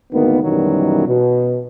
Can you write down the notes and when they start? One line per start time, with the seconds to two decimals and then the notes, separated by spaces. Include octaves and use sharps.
0.13 G#1 D2 D#3 A#3 B3
0.44 F#2 B2 D#3 E3 F#3 G3
1.07 B2